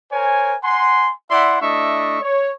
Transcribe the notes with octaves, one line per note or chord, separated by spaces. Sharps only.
A#4 C5 C#5 G#5
F#5 G#5 A#5 C6
E4 D5 E5 F#5 C6
A3 D4 E4 D#5 E5 C#6
C#5